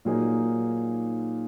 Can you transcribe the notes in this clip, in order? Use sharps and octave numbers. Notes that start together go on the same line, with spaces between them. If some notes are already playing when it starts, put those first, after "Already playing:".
A#2 F#3 A#3 D#4 G#4